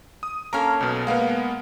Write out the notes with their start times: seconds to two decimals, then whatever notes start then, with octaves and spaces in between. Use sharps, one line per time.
0.23 D#6
0.53 A#3 C#4 A4 A#5 C#6 F6
0.81 B1 B2
1.07 G#3 A#3 B3 F5 F#5